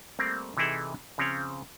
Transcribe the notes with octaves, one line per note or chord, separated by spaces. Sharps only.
G3 A3 A#3 C4
C3 E3 D#4 E4 G#4 A4
C#3 F3 C4 C#4 C#5